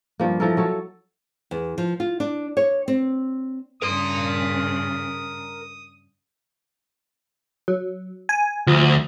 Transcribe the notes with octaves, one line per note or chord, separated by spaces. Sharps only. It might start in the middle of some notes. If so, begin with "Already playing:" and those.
G2 F3 A#3
E3 F3 A4 A#4
F#3 A4 C#5
E2
F3
F4
D4
C#5
C4
G2 C#3 A#4 C6 D#6
F#3
G#5
D2 F3